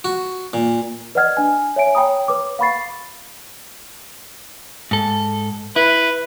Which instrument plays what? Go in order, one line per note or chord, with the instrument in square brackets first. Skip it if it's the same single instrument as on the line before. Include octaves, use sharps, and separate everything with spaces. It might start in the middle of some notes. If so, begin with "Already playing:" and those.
[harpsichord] F#4
A#2
[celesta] B4 D5 D#5 F#5 F6 G#6
D4 G#5
C#5 E5 G#5 D7
C#5 G5 A#5 B5 D#6
B4 C#5 D6
F5 F#5 B5 C#6 A6 C7
[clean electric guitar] G#2 A4
[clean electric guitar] E4 [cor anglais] B4